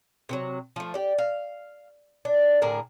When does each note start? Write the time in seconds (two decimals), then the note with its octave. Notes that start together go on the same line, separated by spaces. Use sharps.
0.29 C3 E3 F#3
0.76 F3 A3
0.94 G4 D5
1.19 F5
2.25 D4
2.62 A2 D3 G#4 A#4